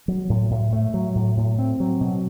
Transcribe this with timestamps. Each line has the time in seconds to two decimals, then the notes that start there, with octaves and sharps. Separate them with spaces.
0.08 F#3
0.29 A2
0.51 A2
0.73 A3
0.94 F#3
1.15 A2
1.37 A2
1.59 C4
1.80 F#3
2.01 B2